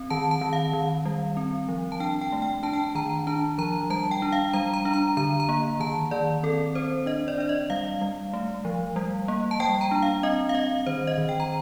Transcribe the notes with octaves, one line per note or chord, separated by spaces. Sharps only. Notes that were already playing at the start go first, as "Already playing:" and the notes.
Already playing: C4
D#3 A5
A5
D#3
F5
D#3
G3
C4
F3
A5
D4 G5
G5
A3
G5
D4 A5
G5
A5
D#3 A#5
D4 A5
F3 A#5
G3 A5
G5
D4
F5
G3 A#5
A#5
D4
A#5
D3 A#5
A#5
A#3
D#3 A5
D#3 D5
C4 A4
C4 C5
D4 D#5
D5
D4 D5
D#5
G3 F5
G3
A3
F3
G3
A#3
A5
G3 G5
A#5
D4
F5
C4 D#5
F5
C4 D#5
D#3 C5
D#5
D#3
G5
A#5